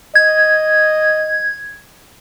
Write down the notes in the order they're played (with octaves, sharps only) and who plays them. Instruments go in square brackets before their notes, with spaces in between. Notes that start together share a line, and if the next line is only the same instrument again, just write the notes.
[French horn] D#5 [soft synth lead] G#6